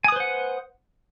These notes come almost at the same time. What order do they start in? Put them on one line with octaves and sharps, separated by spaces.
G#5 D#6 B4 C5 F#5